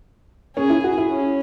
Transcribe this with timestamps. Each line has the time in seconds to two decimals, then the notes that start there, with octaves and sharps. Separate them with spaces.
0.57 C#4 G#4
0.70 E4
0.84 F#4
0.98 E4
1.11 C#4